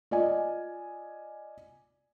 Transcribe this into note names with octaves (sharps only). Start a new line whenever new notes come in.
F4 D5 D#5 G#5